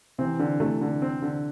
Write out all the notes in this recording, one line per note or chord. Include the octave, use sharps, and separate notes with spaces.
C3 E3 C4
D3
C3 E3 A3
D3
C4
D3